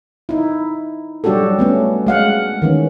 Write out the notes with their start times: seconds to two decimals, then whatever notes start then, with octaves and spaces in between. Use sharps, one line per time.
0.29 D#4 E4
1.24 F#3 G3 D4 F#4 G4 A4
1.59 A3 B3 C#4
2.07 G#3 F5 F#5
2.62 D#3 E3 C#4